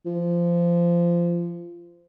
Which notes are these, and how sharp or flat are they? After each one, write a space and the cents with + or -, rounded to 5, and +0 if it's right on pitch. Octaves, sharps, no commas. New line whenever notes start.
F3 -20